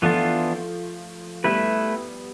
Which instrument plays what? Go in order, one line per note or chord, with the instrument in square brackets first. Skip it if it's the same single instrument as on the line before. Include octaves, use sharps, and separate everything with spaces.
[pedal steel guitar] E3 B3 D4 F4 [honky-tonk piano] F3 A3
[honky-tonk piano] G3 B3 [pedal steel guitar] A3 E4 B4